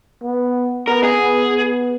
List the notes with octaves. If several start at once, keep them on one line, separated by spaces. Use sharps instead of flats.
B3
B3 A#4
G#4
B3
B3